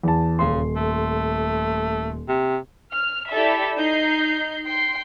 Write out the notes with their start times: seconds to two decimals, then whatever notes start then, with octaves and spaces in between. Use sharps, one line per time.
0.03 E2 A5
0.39 D#1 C#3 C6
0.76 A3
2.28 C3
2.92 F6
3.31 E4 G4 A4 D5 E5
3.78 D#4 G6 C7
4.65 G5 C6 C7